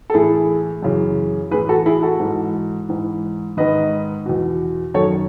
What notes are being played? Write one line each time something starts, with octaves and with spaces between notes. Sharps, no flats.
A4
A2 E3 E4 G#4
F#2 C#3 E3
A2 E3 G#4 B4
F#4 A4
E4 G#4
F#4 A4
G#2 E3
G#2 E3
G#2 D#3 B4 D#5
E2 B2
F#2 D#3 A4 C#5